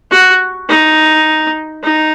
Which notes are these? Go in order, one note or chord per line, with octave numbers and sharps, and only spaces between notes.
F#4
D#4
D#4